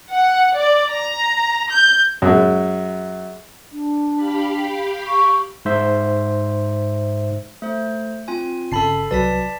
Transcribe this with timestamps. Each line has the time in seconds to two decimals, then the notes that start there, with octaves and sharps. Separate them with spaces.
0.11 F#5
0.56 D5
0.93 A#5
1.71 G6
2.22 F#2 G#3
3.72 D4
4.15 G4 F5 B5
5.07 C#6
5.65 G#2 C5 E5
7.62 A3 C5
8.28 C4 F4 G#5
8.72 G1 C#3 A4 A5 B5 C7
9.11 C2 F#3 B4 D5 A5 B6